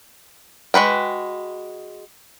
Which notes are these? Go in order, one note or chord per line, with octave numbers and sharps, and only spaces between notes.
G#3 F#4 B4 G5